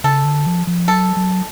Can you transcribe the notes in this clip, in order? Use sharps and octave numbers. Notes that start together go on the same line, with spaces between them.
C#3 A4
D3
F3
F3
F#3 A4
F#3